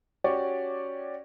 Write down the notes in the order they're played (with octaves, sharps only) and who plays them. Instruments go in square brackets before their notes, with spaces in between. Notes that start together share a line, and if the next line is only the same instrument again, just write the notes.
[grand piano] C#4 F#4 G4 C#5 D5